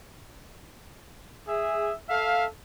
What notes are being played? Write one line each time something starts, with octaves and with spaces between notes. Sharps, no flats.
G#4 E5
A4 E5 F5